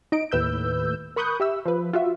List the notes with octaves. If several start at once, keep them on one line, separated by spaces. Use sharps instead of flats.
D#4 D#5 D7
D#2 A2 B4 E6 G6
A#4 B5 C#6 D#6 F#6 G6
G4 E5 E6
F3 B4
F4 F#4 E5